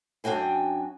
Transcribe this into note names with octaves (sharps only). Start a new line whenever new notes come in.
F#2 D4 F#4 G5 G#5